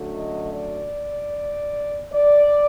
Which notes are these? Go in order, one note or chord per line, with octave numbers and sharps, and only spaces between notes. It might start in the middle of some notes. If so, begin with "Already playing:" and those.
Already playing: F#2 D3 F#3 A3
D#5
D5
D5